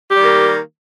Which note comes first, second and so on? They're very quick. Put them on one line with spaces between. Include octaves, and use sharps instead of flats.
G4 G3 D#3 A#3